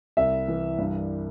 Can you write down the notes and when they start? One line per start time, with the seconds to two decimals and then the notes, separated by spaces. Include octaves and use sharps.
0.17 C2 E5
0.48 E3
0.78 G2